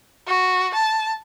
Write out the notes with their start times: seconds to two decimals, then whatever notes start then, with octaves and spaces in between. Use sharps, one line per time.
0.27 F#4
0.74 A5